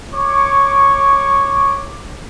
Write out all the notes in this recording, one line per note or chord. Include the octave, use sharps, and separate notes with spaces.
C#5 C#6 D6